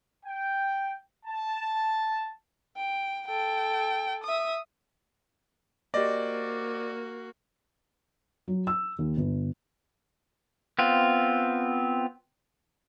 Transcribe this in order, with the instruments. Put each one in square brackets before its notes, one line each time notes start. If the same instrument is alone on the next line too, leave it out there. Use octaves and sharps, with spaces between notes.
[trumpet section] G5
A5
[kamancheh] G5
A4 G5
E5 D#6
[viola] A#3 F#4 [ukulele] G4 C5 D#5 [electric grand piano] D5
[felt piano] F#3
E6
D#2
G1
[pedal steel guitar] B3 C4 F4